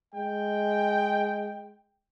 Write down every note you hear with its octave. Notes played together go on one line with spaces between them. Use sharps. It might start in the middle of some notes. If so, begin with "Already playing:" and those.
G#3 G5